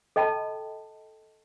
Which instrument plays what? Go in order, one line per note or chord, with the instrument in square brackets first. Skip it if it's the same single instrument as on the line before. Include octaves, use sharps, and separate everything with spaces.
[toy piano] A4 D#5 G5 A5 B5